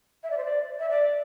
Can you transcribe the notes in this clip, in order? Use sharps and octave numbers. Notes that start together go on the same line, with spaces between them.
E5
D5
C5
D5
E5
D5